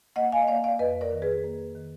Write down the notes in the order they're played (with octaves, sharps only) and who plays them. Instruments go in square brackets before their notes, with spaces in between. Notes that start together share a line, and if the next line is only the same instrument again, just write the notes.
[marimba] A#3 D#5 F#5
F5 G#5
D#5
A#3 D5 F5
D5 F5
F2 B4 D#5
A#4 D5
D#3
G#4 B4
A#3
D#3